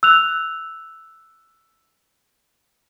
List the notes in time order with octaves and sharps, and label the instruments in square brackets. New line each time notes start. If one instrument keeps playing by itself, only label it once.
[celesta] E6 F#6 F7